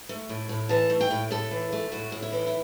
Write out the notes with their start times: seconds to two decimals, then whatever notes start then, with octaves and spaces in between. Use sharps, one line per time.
0.09 A3
0.29 A2
0.49 A2
0.69 E3 A5
0.90 A3
1.00 G5
1.11 A2
1.31 A2 A4
1.51 E3
1.72 A3
1.92 A2 F#4
2.12 A2
2.22 E4
2.33 E3
2.47 E4